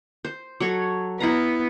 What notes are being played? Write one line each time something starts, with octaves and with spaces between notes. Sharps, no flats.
C5
F#3 A4 C#5
B3 E4 F5 A#5